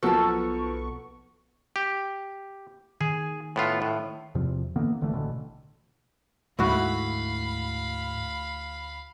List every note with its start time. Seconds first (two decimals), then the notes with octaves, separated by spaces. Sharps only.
0.03 B1 F3 B3 F#4 A4 A#4 A5 C#6
1.76 G4
3.01 D#3 G#4
3.56 A2 B3 F4
3.82 A2
4.35 E2 C3 F3
4.76 D3 E3 A#3 B3
5.01 G1 D3 E3 A3
5.13 A1 B2 D3
6.59 D2 G#2 E4 F#4 F5 B5